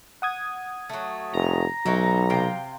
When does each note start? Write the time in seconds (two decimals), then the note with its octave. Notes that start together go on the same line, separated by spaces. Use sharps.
0.22 F#5 D#6 G#6
0.89 F#3 A3
1.33 F1 A#5
1.86 B1 F#3 D#4 E4 F#4
2.30 C3 F5 G5